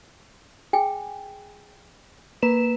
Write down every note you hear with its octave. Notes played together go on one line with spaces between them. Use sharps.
G#4 G5 G#5
A#3 B4 E7